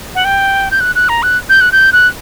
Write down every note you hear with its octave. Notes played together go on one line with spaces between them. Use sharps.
F#5
G5
G6
F#6
F#6
A#5
F#6
G6
F#6
G6
F#6